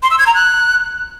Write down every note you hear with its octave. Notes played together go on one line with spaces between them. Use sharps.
C6
E6
G#6
A#5
F#6